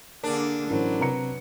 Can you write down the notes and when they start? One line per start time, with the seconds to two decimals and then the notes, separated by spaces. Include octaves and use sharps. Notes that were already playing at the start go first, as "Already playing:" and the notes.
0.24 D3 A#3 D4 G#4 A#4
0.70 A1 F#3 E4 A#4 C5
1.00 C3 B4 A#5 C#7